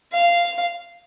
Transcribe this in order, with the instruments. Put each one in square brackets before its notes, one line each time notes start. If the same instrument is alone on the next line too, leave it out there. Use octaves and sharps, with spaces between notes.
[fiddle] F5